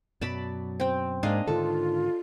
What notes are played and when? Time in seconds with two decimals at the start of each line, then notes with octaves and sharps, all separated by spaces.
0.21 F#2 B2 F#3 D5 A5 B5
0.80 C4 G5
1.23 G#2 A#3 D4 D#5 F5
1.48 G#2 D3 D#3 F4 A4